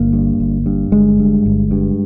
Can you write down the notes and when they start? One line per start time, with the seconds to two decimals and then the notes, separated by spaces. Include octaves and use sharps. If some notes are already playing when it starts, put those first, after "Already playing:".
Already playing: G1 A#3
0.13 G2
0.40 G1
0.66 G2
0.92 G1 G#3
1.19 G2
1.46 G1
1.71 G2